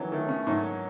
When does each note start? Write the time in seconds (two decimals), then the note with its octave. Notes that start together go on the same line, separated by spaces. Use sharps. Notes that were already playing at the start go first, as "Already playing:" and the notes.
Already playing: D#3 E3 F#3
0.12 D#3 A3
0.29 C#3
0.47 G#2 F#3